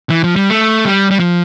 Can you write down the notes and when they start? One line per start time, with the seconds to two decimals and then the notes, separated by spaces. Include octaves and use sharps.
0.10 E3
0.24 F3
0.36 G3
0.50 A3
0.85 G3
1.11 G3
1.19 F3